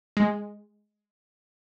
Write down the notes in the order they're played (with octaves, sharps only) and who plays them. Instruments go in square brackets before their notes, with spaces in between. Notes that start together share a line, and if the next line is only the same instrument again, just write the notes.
[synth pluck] G#3